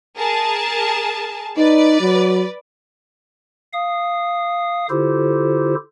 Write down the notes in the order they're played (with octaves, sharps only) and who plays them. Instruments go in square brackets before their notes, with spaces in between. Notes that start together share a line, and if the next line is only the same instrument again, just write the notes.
[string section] G#4 A#4 A5
[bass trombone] D#4 [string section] B4 D5
[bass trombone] F#3
[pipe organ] F5 D#6
D3 E4 F4 G4 A4 C5